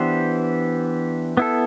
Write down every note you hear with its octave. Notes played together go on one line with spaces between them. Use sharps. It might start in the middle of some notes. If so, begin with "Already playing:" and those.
Already playing: E3 B3 D4 G4 C5
B3 E4 A4